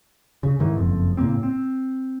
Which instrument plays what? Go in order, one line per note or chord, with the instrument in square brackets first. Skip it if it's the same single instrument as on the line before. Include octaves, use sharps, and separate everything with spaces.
[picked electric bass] C#3
G#2 D#3 E3
F#1 F2
A2 C#3 A#3 C4
C4